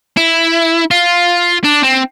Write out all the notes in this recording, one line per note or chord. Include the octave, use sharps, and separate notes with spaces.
E4
F4
D4
C4